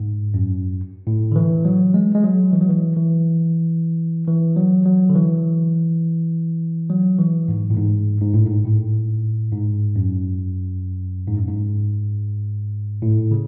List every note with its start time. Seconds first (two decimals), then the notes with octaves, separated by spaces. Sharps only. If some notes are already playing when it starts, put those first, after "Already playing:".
Already playing: G#2
0.34 F#2
1.07 A2
1.32 D3
1.36 E3
1.65 F#3
1.94 G#3
2.15 G#3
2.24 F#3
2.53 E3
2.61 F#3
2.69 E3
2.96 E3
4.28 E3
4.57 F#3
4.86 F#3
5.10 D3
5.15 E3
6.90 F#3
7.19 E3
7.48 G#2
7.70 A2
7.77 G#2
8.21 G#2
8.33 A2
8.46 G#2
8.65 A2
9.52 G#2
9.96 F#2
11.27 G#2
11.38 F#2
11.48 G#2
13.02 A2
13.31 C#3